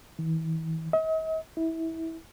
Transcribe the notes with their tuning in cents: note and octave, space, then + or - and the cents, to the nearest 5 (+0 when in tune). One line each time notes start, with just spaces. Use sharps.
E3 -40
D#5 +45
E4 -20